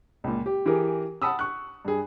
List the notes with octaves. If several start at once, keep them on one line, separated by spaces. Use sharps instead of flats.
C#2 A#2
G4
E3 G4 G#4 A#4
F#5 A5 B5 D#6 E6
C#6 F#6
G2 G#4